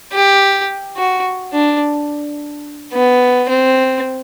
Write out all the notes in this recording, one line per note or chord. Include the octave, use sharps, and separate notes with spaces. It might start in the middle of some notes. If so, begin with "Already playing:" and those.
G4
F#4
D4
B3
C4